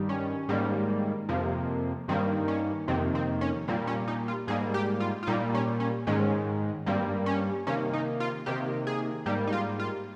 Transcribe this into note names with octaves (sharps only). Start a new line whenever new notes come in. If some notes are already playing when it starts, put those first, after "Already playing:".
Already playing: G2 D#3 G3
C#4
G#2 D#3 G3 A#3
F2 C3 F3 A#3
G2 D#3 G3 A#3 C4
C#4
F2 C3 D#3 A#3 C4
C4
C#4
A#2 G3 A#3 C4
C#4
D#4
F4
G#2 G3 A#3 G#4
G4
F4
F4
A#2 G3 A#3 D#4
C#4
C#4
G#2 D#3 G#3 C#4
G2 G3 A#3 C4
C#4
C3 D#3 A#3 C#4
D#4
F4
C3 D#3 A#3 G4
G#4
G#2 G3 A#3 G4
D#4
F4
F4